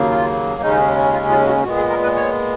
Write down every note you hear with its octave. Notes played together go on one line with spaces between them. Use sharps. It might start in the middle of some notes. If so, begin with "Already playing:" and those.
Already playing: D#2 C#3 F#3 A#3
F4
D#2 C#3 G#3 C#4 D#4
F4
F4
F#4
A#2 G#3 B3 F#4
G#4
A#4
B4
C#5